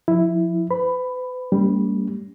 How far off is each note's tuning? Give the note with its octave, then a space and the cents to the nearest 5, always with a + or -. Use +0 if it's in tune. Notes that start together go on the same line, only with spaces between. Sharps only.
F3 +15 E4 +0
B4 +40 B5 +10
G3 +0 A#3 -40 C#4 +30